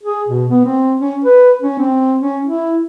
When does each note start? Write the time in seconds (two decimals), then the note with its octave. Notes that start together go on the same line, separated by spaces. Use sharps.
0.03 G#4
0.28 B2
0.50 B3
0.65 C4
1.00 C#4
1.24 B4
1.62 C#4
1.78 C4
2.21 C#4
2.45 E4